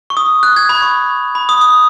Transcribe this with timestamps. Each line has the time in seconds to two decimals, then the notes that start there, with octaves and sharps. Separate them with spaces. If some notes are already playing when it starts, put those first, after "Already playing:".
0.10 C#6
0.17 D#6
0.43 F#6
0.56 G#6
0.69 B5
0.82 C#6
1.35 B5
1.49 D#6
1.61 D#6